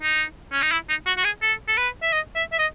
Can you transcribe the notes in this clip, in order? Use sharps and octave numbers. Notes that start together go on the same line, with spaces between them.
D#4
C#4
D#4
E4
D#4
F#4
F#4
G#4
A4
A4
B4
E5
D#5
E5
E5
D#5